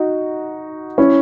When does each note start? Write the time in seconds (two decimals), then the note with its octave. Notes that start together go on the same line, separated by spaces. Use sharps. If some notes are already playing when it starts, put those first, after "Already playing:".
Already playing: D#4 F#4
0.98 C#4 E4